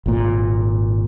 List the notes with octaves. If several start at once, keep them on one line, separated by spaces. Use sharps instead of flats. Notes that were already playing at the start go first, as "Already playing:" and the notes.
G#1 A#2